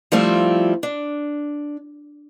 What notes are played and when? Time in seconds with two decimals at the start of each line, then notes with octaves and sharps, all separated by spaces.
0.12 F3 G3 A3 C4 E4 F4
0.83 D4